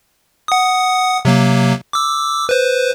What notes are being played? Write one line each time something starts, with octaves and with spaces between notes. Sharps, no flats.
F#5 D#6
C3 F#3 A#3
D6 E6
B4 C5